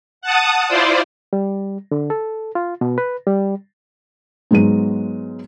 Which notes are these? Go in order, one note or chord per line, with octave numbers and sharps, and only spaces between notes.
F#5 A5 D#6
E4 F4 C5 D5
G3
D3
A4
F4
B2
B4
G3
G#2 F#3 G#3 B3 D#7